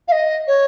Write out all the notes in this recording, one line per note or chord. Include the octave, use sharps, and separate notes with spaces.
F5
D#5
C#5